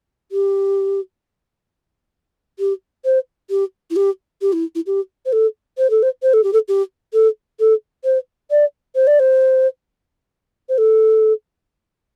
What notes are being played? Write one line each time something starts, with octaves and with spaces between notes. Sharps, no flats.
G4
G4
C5
G4
E4
G4
G4
E4
E4
G4
C5
A4
C5
A4
C5
C5
A4
G4
A4
G4
A4
A4
C5
D5
C5
D5
C5
C5
A4